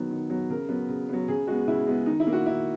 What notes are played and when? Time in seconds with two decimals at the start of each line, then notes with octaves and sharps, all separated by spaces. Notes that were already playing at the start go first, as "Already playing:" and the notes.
Already playing: D#3 F#3 B3
0.11 D#3
0.30 F#3 B3
0.50 C#3 A#4
0.69 F#3 B3
0.89 C#3
1.09 F#3 B3
1.28 C#3 G#4
1.47 G#3 B3 F#4
1.67 C#3 E4
1.87 G#3 B3
2.06 D#3 D#4
2.20 E4
2.27 A#3
2.33 F#4
2.46 D#3 E4